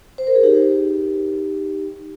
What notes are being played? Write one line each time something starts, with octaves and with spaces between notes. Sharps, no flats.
C5
A#4
G#4
D#4 G4